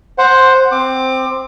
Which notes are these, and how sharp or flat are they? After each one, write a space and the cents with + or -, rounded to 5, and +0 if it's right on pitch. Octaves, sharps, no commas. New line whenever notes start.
C5 +5 F#5 +0
C4 +0 D6 +25